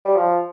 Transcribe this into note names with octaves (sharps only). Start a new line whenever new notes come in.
G3
F3